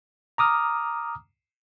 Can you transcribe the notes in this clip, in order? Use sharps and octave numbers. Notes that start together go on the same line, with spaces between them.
A#5 D6 D#6 F6